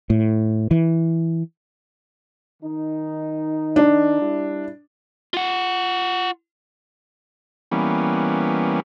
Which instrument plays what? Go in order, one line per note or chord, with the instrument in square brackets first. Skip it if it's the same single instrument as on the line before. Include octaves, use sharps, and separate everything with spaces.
[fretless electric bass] A2
E3
[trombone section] D#3 D#4
[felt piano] D4
[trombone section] G3 E4
[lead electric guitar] F4 F#5
[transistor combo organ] E3 G3 A#3 B3 C#4